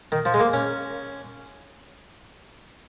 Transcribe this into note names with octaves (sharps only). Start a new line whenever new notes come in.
D#3
F3
G#3
A#3
C#4